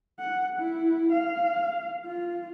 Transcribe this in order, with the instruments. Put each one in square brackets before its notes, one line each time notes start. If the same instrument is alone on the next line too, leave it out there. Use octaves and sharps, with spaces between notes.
[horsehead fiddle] F#5
E4
F5
F4